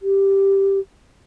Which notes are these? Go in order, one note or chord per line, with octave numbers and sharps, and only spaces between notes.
G4